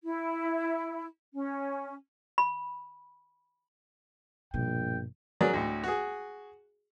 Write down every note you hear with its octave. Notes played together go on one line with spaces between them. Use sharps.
E4
C#4
B5
A#1 G2 B2 G5
F#3 G#4 A#4 D5
D2 A2
F#4 G#4